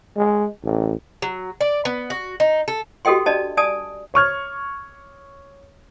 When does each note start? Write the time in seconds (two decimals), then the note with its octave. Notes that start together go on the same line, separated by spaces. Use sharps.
0.17 G#3
0.64 A1
1.22 F#3
1.61 D5
1.85 B3
2.10 F#4
2.40 D#4
2.68 A4
3.05 F#4 G4 A4 D#5 G5 C6
3.26 D4 D5 D#5 A5
3.57 D5 G#5 A5 D#6
4.14 C#5 C#6 F6 G#6